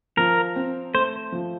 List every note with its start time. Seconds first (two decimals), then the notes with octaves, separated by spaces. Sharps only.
0.17 F3 A#4
0.56 C4
0.94 A3 C5
1.32 F3